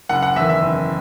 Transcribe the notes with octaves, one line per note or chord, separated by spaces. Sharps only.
F#1 F#5
F#5
E2 D#3 E5
E5
F#1